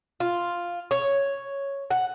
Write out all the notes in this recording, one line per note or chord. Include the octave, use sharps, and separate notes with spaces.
F4
C#5
F#5